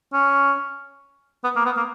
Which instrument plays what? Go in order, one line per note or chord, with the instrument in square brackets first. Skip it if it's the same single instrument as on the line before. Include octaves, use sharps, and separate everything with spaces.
[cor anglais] C#4
B3
A#3
B3
A#3